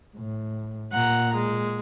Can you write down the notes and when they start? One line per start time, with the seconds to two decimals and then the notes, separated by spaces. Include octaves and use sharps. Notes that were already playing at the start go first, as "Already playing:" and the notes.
0.17 A2
0.92 A#2 F#5 A#5
1.34 G#3